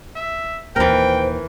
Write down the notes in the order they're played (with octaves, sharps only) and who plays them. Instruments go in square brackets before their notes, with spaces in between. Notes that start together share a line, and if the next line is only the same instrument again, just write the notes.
[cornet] E5
[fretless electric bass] D#2 A#2 [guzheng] E3 A#4 [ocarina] C5 [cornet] G5